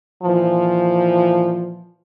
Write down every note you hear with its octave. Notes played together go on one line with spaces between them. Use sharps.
A#2 E3 F3